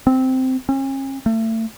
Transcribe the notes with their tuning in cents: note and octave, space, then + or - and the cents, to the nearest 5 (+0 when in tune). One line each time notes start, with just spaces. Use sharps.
C4 -10
C#4 -40
A3 +30